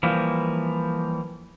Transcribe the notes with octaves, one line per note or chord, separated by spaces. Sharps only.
E3 F3 G3 A#3